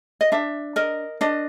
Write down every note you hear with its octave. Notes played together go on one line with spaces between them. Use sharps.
D#5
D4 E5
A#4 D#5
D4 D#5